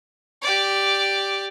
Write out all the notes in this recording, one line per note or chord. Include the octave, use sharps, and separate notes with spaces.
G4 D5